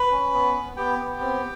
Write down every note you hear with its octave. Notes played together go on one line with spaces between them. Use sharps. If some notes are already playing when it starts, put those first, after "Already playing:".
Already playing: B4 B5
C#4
B3
B3
B3 G4 G5
B3
C4